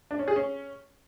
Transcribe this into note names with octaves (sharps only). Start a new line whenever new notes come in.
D4
C#4
G#4
C#4